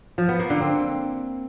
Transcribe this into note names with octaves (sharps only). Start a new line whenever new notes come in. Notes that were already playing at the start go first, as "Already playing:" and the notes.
F3
B3
A#3
D3
C4